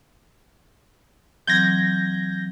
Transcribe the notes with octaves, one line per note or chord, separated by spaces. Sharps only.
E3 F#3 C4 G6 G#6 A#6